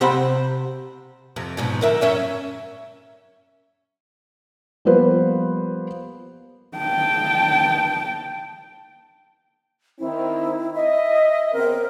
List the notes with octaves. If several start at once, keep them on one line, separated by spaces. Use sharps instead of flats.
C3 G4 C5 F#5 B5
F2 C3
G#2 B2 F3
D3 A#4 E5
F#2 C#4 E5
F3 G3 A#3 B3 B4 C5
G5 A5
D#3 C4 E4
D#5 E5
C#3 B3 C4 A#4